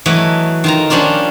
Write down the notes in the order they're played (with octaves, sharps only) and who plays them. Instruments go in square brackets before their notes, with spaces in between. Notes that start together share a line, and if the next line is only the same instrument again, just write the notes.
[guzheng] E3 F#3 A3 A4 D#5
D#3 F4 A#5
F3 G3 C#4 D4 F4